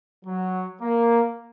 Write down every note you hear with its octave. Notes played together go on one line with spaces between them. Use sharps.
F#3
A#3